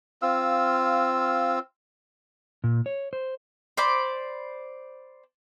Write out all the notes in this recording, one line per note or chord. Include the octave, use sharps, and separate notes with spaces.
C4 F4 F5 E6
A#2
C#5
C5
C5 D5 B5